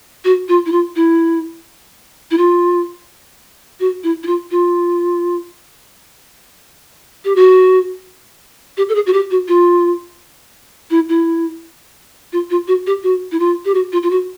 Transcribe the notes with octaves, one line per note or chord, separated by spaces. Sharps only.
F#4
F4
E4
F4
E4
E4
F4
F#4
E4
E4
F4
F4
G4
F#4
G4
A4
G#4
F#4
G4
F#4
F4
E4
E4
F4
F4
F#4
G4
F#4
E4
F4
G4
F#4
F4
F4
F#4